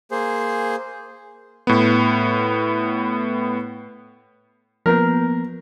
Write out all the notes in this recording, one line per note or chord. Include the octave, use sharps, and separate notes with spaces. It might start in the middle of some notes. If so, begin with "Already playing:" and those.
A#3 G#4 C5
A2 B3
F3 A#3 B3 A#4